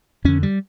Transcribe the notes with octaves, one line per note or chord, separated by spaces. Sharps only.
F2 D3 C#4
G3